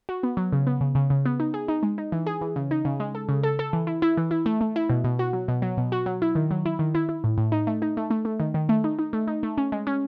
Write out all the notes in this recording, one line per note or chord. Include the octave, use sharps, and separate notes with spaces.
F#4
B3
F#3
C#3
B3
C#3
C#3
C#3
B3
D#4
G#4
D#4
G#3
D#4
E3
G#4
E3
C#3
D#4
C#3
G#3
A4
C#3
A4
A4
E3
E4
E4
E3
E4
A3
A3
E4
B2
B2
F#4
F#3
B2
F#3
B2
F#4
F#3
E4
D#3
F#3
E4
D#3
E4
E4
A2
A2
D#4
A3
D#4
A3
A3
A3
D#3
D#3
A3
D#4
D#4
A3
D#4
A3
C#4
G#3
C#4